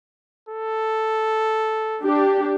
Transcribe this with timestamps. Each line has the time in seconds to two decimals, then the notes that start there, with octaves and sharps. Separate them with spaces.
0.49 A4
2.03 D4 G4